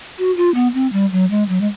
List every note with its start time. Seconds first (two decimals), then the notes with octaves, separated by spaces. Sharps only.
0.18 F#4
0.37 F4
0.55 B3
0.74 C4
0.93 G3
1.12 F#3
1.31 G#3
1.49 F#3
1.61 G#3